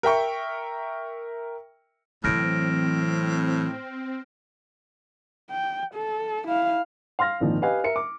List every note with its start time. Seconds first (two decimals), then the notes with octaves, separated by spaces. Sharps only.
0.03 A#4 E5 G5 C#6
2.24 A2 E3 F#3 C4 F6 A#6 D7
5.50 G5
5.94 A4
6.48 E4 F5
7.19 F5 C6 F6 A#6
7.40 G#1 A#2 D#3 F3
7.62 G4 B4 D#5 F5 G#5
7.84 A#4 E5 C#7
7.96 D6